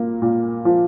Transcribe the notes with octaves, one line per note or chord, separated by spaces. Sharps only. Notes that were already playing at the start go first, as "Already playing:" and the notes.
Already playing: A#2 A#3
A#2
F3